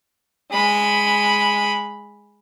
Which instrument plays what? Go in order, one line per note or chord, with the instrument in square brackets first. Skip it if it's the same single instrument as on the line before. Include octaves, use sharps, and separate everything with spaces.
[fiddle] G#3 B5